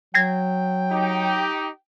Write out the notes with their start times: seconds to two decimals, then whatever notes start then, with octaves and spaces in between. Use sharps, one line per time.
0.15 F#3 G5 G#6 A#6 C7
0.91 D#4 G4